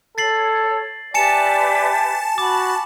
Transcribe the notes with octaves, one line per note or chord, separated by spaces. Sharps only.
A4 C#5 A6 C7 F#7
G4 B4 D5 E5 G#5 A5 C#7 E7
F#4 B5 D6